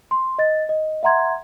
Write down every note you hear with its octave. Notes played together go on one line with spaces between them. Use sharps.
C6
D#5 A6
D#5
E5 F#5 A#5 C6 G#6